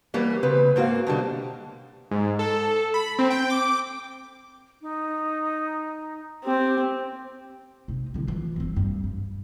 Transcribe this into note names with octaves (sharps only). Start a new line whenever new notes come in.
E3 F#3 G3 A#3
C#3 C4 B4
G#2 A#3 F#4 A#4 F5
B2 D3 G3
G#2
A4
B5
C4
G5
D6
D#4
C4 G4
C3 D#4
D3 E4
E3 F4
G1 C4
G2
G2